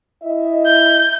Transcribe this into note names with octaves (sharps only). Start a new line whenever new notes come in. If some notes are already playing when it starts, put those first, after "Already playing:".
E4 D#5 E5
G6